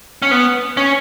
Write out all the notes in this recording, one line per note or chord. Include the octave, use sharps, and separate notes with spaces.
C#4
B3
C#4